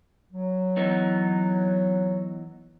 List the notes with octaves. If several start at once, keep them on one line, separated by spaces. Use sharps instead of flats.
F#3
E3 B3 D#4